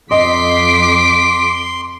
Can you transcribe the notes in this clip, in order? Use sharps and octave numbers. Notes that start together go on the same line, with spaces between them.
F2 D#5 C6 D6 B6 C7